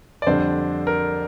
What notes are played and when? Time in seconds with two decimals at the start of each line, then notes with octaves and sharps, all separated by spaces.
0.22 D5
0.27 F2 D3 G3 D4 C5
0.87 A#4